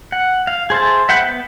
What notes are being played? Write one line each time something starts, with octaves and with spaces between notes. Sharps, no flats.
F#5
F5
G#4 C5 E5 A5
E5 F#5 G5 B5
B3